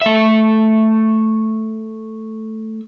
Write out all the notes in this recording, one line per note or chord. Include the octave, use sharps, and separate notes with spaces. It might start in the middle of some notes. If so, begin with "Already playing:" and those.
A3 E5